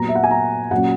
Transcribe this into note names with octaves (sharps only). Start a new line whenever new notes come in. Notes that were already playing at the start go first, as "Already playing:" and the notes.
Already playing: A#2 F#3 B3 A#5
E5
F#5
G#5
A#5
A#2 F#3 C#4 F#5